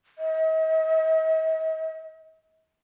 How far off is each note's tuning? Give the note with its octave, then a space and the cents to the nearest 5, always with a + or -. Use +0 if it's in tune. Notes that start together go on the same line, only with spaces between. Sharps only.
D#5 +45